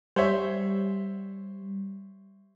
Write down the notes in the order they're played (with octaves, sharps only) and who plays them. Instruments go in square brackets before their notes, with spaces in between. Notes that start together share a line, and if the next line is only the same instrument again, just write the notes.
[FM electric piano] G3 [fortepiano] C5 C#5 E5